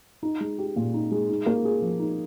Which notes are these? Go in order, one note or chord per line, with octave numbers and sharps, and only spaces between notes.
D#4
G#3
G4
A#2
D#4
G#3
D#4
A#3
G#4
F3
D#4